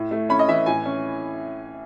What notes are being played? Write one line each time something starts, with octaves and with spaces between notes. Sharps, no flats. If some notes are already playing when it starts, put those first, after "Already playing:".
Already playing: A2
A3
C#4 B5
D#5
E3 E5
A2 G#5
C#4